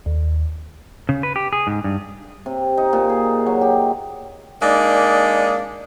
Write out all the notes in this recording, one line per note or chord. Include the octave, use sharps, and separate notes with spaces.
D#2
C#3
B4
G4
G#4
G#2
G2
C3
D#4
A#2
G#4
F#3
G4
G#3 A#3 D4 D#4 D5